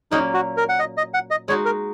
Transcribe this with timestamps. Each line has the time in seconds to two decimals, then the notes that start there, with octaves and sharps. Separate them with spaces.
0.11 A#2 F#3 A#3 C#4 D#4
0.34 F#4
0.57 A#4
0.69 F#5
0.79 D#5
0.97 D#5
1.14 F#5
1.31 D#5
1.48 G#3 D#4 F#4 C#5
1.65 A#4